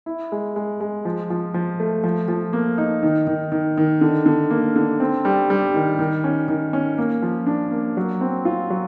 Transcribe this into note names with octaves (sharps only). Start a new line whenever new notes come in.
E4
G#3
G#3
G#3
F3
F3
F3
A3
F3
F3
A#3
D#4
D#3
D#3
D#3
D#3
D3
D3
A#3
D3
C4
G3
G3
D#3
D#3
C#4
D#3
C#4
A#3
F3
D4
A#3
F#3
C4
F4
F#3